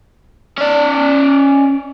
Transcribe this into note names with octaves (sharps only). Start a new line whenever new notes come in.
C#4 D5